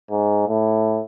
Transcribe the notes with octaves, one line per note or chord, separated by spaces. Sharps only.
G#2
A2